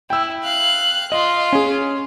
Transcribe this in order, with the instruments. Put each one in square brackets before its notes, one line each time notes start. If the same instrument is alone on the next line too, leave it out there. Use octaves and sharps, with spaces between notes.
[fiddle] E4 [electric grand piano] G5 E6
[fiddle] F5 F#6
[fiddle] F4 [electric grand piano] D#5
[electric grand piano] C#4 G#4